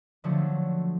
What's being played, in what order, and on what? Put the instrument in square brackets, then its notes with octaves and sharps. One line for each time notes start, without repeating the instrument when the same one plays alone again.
[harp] D3 F3 F#3 A3 D4